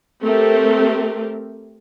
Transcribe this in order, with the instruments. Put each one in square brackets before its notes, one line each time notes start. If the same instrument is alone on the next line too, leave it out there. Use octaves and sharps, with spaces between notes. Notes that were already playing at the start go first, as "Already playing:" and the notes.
[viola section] A3 C4 G4 A#4